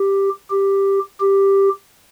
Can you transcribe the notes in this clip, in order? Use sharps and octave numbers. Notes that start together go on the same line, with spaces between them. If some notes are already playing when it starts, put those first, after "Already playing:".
Already playing: G4
G4
G4